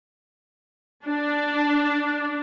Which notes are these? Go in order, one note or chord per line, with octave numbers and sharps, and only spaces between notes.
D4